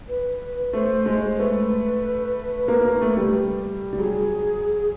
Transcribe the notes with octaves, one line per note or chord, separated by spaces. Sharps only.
B4
A3 C5
G#3
A3 B4
A#3
A#3
A3
G3
G3
F#3 G#4